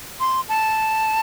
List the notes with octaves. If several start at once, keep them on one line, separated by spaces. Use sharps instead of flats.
C6
A5